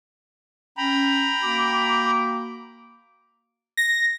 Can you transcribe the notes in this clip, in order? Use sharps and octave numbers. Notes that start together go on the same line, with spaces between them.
C#4 G5 A#5 B5
A#3 F#4 D6
A#6